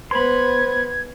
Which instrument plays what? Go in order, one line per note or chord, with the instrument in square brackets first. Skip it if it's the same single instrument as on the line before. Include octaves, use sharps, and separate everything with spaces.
[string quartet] B3 [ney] C5 [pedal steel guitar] B5 C6 [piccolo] G#6